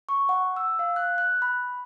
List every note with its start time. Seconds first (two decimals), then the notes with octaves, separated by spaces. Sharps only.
0.09 C#6
0.29 F#5
0.56 E6
0.79 F5
0.96 F#6
1.18 F#6
1.42 B5